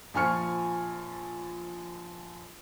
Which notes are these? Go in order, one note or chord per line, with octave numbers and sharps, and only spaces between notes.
A#1 F3 G#5 C#6 F6 C#7